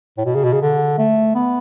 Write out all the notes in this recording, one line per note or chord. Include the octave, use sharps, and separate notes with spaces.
A2
B2
C#3
B2
C#3
D3
A3
B3